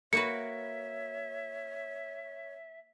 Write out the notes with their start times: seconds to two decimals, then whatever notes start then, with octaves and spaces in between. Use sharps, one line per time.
0.13 A#3 F#4 B4 C#5 E5 C#7